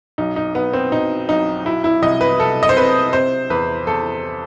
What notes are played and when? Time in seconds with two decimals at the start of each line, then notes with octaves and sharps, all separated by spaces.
0.18 B1 D#4
0.36 D#4
0.55 B1 B3
0.73 C4
0.92 B2 D#4
1.29 B1 D#4
1.65 F#3 E4
1.84 E4
2.02 C2 D#5
2.21 B4
2.40 C2 A4
2.63 D#5
2.69 C5
2.76 C3 B4
3.13 C3 C5
3.50 E2 B4
3.87 E2 A4